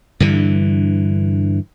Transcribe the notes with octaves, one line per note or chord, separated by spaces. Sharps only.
G2 D3 E3